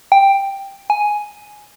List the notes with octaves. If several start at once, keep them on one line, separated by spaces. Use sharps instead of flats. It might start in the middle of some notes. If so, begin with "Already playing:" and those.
G5
G#5